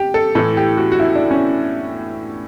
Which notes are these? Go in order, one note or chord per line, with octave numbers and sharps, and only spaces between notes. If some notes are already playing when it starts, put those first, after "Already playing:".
Already playing: G4
A4
A2 E3 A4
G4
F#4
F#4
E4
D4
C#4